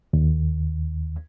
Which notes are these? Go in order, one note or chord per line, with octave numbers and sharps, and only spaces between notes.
D#2